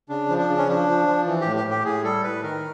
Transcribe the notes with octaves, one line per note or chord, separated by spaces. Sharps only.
C#3 D4
F3
D4
C#3
C#4
F3 D4
F3
F3
E3
A2 G4
G4
A2
G4
A2 G#4
G3 A4
A2 B4
D#3 A#4